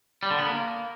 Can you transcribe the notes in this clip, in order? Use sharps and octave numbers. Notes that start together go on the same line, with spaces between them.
G3
D3
B3
A#3